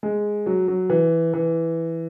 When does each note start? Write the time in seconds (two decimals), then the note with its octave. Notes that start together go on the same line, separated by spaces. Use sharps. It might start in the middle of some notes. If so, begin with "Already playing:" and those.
0.03 G#3
0.46 F#3
0.68 F#3
0.90 E3
1.34 E3